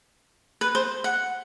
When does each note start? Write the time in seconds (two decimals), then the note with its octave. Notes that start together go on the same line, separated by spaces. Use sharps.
0.61 B4
0.75 C5
1.04 F#5